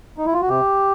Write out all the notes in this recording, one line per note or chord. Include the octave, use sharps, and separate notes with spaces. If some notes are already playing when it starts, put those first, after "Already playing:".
D#4
E4
F4
F#4
C3 G4